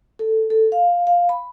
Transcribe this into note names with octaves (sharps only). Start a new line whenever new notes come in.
A4
A4
F5
F5
B5